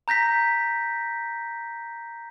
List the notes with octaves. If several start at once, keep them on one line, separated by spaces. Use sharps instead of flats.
A#5 G6 A#6 B6